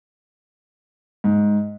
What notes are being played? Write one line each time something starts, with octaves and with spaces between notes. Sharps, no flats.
G#2